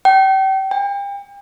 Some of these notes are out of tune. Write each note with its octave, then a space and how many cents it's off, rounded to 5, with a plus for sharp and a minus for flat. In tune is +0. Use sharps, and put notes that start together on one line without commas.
G5 -35
G5 +40